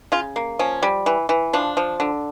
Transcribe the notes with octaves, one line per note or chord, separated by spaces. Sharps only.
C#3 F4
A#3
F3 C#4
G3
E3
E3
F3 D4
F3
D3